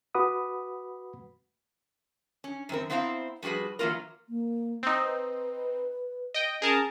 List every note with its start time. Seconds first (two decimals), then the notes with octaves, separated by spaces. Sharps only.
0.15 F#4 B4 F#5 B5 D6 D#6
2.44 C#4
2.69 F#2 D#3 C4 A#4
2.90 B3 C4 E4 C5 F5 A#5
3.42 F3 G3 F#4 G#4 B4
3.79 E3 F#3 A#3 F4 A#4
4.29 A#3
4.83 C4 D#4
5.04 B4
6.34 D#5 G5
6.62 C#4 G#4 A#4 A5